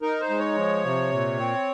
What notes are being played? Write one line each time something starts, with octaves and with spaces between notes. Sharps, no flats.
D#4 A#4
C5
G#3
C#5
F3
C3
A#2
C4